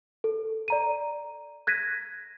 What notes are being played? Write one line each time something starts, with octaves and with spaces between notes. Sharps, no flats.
A4
D5 A#5 D#7
F#6 G#6 A#6 B6 D#7